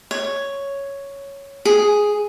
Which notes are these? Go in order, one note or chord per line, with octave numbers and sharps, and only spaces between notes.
C#5
G#4